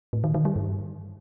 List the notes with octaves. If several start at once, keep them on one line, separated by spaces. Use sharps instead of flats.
A2
D#3
D#3
G3
G2